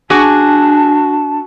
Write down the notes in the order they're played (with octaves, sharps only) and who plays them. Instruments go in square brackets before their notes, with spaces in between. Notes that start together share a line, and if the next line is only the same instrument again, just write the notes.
[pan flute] D4 [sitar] F#4 [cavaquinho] G#4 D6 [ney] A5